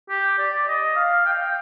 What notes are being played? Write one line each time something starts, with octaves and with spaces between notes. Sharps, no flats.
G4
D5
D#5
F5
G5
F5
G5